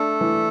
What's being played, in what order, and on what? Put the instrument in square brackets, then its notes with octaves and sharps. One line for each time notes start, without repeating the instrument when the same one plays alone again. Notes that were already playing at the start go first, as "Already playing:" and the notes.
Already playing: [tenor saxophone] A3 [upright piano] D4
[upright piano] E3